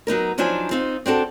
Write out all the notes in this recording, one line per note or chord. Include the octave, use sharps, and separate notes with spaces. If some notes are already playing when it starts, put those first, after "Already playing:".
F#3 B3 D#4 A#4
F3 F#3 D4 D#4 C5 G#5
C4 D#4 F4
C4 D4 F#4 A4